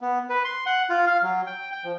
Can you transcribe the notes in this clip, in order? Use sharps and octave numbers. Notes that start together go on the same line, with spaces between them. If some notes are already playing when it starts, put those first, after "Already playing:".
B3
B4
C6
F#5
F4
F5
F#3
G5
G5
F3